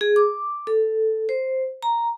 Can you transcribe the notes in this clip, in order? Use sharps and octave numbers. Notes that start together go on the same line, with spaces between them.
G#4
D6
A4
C5
A#5